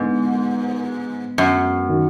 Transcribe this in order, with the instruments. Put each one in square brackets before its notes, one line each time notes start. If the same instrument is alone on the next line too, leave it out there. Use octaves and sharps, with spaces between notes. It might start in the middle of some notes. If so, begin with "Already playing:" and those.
Already playing: [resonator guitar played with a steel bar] G#2 [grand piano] D3 G#3 B3
[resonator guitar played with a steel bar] F#2
[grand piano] D#3 F#3